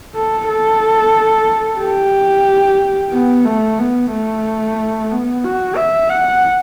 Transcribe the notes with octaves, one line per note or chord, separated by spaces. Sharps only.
A4
A4
G4
B3
A3
B3
A3
B3
F#4
E5
F#5